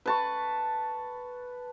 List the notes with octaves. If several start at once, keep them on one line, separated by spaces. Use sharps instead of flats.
B4 A5 C#6